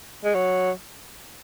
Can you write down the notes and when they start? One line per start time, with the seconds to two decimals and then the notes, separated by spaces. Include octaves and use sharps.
0.24 G#3
0.35 F#3